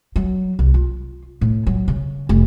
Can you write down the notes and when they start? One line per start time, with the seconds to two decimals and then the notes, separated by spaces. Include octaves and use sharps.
0.16 F#3
0.59 C2
0.74 F4
1.41 A2
1.67 F#3
1.88 C#3
2.29 F1